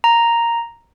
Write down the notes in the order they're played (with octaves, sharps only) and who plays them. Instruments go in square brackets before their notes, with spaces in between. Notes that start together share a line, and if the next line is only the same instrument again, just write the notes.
[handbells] A#5